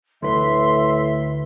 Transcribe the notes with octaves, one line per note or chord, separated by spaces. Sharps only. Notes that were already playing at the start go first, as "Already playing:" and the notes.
D2 A2 B4 E5 C6